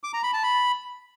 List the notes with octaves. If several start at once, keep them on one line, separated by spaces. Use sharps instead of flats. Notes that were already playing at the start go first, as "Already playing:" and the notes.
D6
A#5
B5
A5
B5